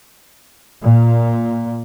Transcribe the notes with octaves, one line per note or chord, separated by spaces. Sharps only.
A#2